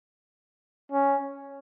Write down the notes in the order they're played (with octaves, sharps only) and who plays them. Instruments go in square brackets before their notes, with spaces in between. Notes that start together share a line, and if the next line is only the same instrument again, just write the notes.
[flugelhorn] C#4